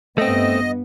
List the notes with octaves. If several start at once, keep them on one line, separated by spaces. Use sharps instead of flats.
G2 A3 B3 C4 D#5